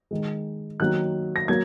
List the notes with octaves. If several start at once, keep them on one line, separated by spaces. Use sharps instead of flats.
D#3 G#3
D#3 F#3 A#3 F#6
A#6
F#3 A#3 G#6